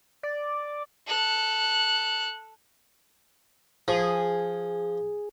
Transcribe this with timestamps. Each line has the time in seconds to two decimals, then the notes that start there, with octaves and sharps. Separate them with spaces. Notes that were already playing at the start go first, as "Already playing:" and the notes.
0.23 D5
1.07 A4 F#6
3.88 F3 G#4